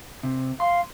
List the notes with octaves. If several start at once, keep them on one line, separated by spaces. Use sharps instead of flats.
C3
F5 C6